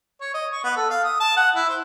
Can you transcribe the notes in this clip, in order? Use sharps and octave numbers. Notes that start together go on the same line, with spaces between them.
C#5
D#5
C#6
B3
A4
F5
D#6
A5
F#5
E4
C5